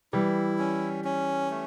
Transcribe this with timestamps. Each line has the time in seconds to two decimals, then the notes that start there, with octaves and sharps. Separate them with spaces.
0.13 E3 G3 E4
0.58 C#4
1.04 C#4
1.50 A3